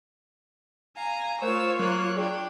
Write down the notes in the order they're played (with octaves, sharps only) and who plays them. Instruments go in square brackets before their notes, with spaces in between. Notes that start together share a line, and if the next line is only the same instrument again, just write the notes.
[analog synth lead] F5 [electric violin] G#5 [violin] A#5
[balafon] A3 A#4 [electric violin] F4 C#5 [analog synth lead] C5 [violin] E6
[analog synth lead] F#3 [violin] A#3 F#6 [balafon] A#4
[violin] D4 G5 [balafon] G#4 D5